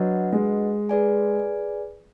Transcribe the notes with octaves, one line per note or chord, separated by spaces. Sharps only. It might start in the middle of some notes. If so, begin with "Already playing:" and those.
Already playing: F#3 D4 F#4 B4 D#5 F#5
G#3
G#4 B4 D5 G#5